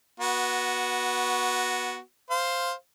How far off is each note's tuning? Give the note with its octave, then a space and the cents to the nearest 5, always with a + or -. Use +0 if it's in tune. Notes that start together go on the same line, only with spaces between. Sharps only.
B3 -20 F#4 +0
C5 +0 F5 +0